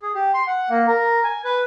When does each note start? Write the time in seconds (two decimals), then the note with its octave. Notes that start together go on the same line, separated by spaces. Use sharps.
0.02 G#4
0.15 G4
0.34 C6
0.47 F#5
0.70 A#3
0.87 A#4
1.24 G#5
1.45 B4